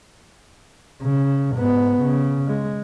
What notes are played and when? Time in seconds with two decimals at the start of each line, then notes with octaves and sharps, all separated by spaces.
1.03 C#3
1.56 G#2 B3
2.02 C#3
2.47 G#3